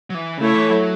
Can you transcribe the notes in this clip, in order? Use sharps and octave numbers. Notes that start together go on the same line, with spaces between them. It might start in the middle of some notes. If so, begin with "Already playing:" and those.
F#3
E3
C#3 A3 E4 A4 C#5
E3
F#3